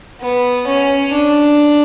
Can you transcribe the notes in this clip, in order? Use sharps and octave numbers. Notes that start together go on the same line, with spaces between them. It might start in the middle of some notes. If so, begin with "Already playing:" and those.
B3
C#4
D4